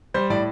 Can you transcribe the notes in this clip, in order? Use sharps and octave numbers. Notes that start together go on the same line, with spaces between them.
G3 C5
A2 D5